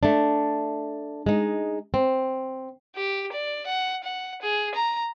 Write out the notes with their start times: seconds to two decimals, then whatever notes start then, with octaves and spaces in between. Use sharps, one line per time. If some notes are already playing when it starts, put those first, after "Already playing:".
0.03 A3 D4
1.26 G#3 D#4
1.94 C4
2.96 G4
3.32 D5
3.66 F#5
4.03 F#5
4.42 G#4
4.75 A#5